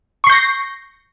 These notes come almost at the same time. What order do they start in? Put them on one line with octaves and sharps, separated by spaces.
C#6 C7 G6 A#6